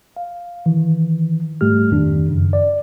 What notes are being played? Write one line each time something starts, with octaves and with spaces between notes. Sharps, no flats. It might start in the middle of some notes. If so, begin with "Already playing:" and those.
F5
D#3 E3
G#2 G3 A3 G4 F6
F2 D#3 D4
F#2 C#3
D5